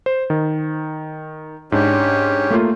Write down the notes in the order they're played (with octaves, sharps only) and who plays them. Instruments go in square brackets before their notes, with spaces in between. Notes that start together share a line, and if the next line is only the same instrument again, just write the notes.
[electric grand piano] C5
D#3
[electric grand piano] G#2 D4 [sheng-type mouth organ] C#4 G4
[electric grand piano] A3 A#3 F4